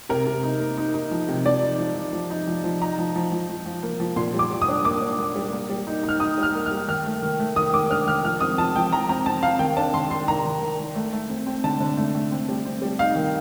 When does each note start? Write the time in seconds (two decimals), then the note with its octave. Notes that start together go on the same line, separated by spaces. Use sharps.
0.09 C3 A#4
0.27 C3
0.43 D#4
0.60 A#3
0.78 D#4
0.94 D#4
1.11 F3
1.29 C3
1.45 F3 D5
1.62 D#4
1.79 F3
1.96 F3
2.13 F3
2.30 D#4
2.47 F3
2.64 F3
2.81 D#4 A#5
2.98 F3
3.16 F3
3.32 F3
3.49 F3
3.66 F3
3.83 A#3
4.00 F3
4.16 A#2 C6
4.34 G3
4.39 D6
4.51 G3
4.62 D#6
4.68 D4
4.85 A#3 D6
5.01 D4
5.18 A#3
5.36 G3
5.53 A#3
5.70 G3
5.87 D#4
6.03 D#4
6.09 F6
6.20 D#4 D#6
6.38 G3
6.43 F6
6.55 A#3
6.66 F6
6.72 G3
6.88 D#3 F6
7.06 A3
7.23 D#3
7.39 A3
7.56 D#3 D#6
7.73 D#3 D6
7.90 D4 F6
8.07 D#3 F6
8.24 F3 F6
8.40 C4 D#6
8.58 F3 A5
8.75 F3 G5
8.92 F3 A#5
9.09 C4 A#5
9.26 C4 A5
9.43 C4 F5
9.59 D#3 G5
9.77 D4 A5
9.94 D#3 C6
10.10 D#3 C6
10.28 D#3 A#5
10.45 D#3
10.62 D#3
10.79 D#3
10.95 A3
11.13 A3
11.29 C4
11.47 C4
11.64 D3 A5
11.80 D3
11.97 A3
12.15 A3
12.32 C4
12.49 G3
12.65 C4
12.82 G3
12.99 D#4 F5
13.16 D#3